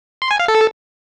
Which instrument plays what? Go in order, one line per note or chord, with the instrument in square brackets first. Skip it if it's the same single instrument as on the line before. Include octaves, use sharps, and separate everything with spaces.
[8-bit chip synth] C6
G#5
F5
A4